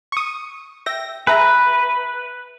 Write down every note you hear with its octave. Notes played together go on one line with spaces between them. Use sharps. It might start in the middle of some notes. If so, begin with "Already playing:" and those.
C#6 D#6
E5 G5 A#6
G#4 B4 E5 A#5